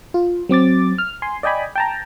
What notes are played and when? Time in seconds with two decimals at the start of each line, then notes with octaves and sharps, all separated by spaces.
0.14 F4
0.49 F#3 C4 D6 A6
0.98 F6
1.22 G#5 C6
1.43 D5 D#5 G5 G#5 B5
1.76 G5 A5 A#5